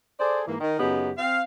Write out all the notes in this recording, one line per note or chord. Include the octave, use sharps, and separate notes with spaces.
G#4 A4 C5 D5
G#2 E3 A#3
D#3
F#2 C#3 B3 D#4 G4
C4 F5